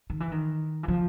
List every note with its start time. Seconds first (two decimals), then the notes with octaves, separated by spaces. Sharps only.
0.10 D#3
0.20 E3
0.32 D#3
0.83 E3
0.88 F3